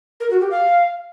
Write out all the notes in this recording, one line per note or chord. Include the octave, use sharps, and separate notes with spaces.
A#4
F#4
G4
F5